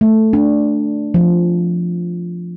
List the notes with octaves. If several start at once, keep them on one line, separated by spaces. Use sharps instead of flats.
A3
D4
F3